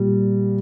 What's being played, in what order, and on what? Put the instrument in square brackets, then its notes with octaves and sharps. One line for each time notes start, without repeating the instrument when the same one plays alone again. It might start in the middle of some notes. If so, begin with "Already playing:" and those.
Already playing: [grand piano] A#2 G3